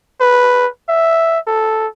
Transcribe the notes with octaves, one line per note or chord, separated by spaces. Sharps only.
B4
E5
A4